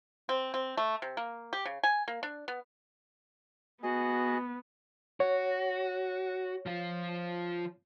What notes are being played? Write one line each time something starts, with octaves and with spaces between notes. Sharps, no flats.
C4
C4
A3
C3
A#3
G4
C#3
G#5
A#3
D4
B3
B3 F#4 G#4 D#5
F#4 C#5
F3 F4